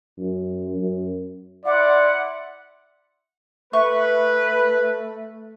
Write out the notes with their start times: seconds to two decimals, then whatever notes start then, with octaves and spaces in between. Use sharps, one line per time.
0.18 F#2
0.77 F#2
1.65 E4 D5 F#5 C6 D6
3.73 A3 B4 E5 C#6